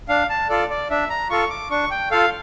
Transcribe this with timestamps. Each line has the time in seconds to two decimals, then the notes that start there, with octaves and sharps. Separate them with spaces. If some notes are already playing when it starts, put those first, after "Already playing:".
0.08 D4 F5
0.29 A5
0.49 F4 A4 D5
0.70 D5
0.90 D4 E5
1.10 A#5
1.30 F4 A4 C#6
1.50 D6
1.71 D4 C#6
1.91 G5
2.11 F4 A4 F5